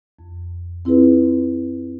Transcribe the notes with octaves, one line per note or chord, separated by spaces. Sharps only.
F2
C4 E4 F4 G#4 B4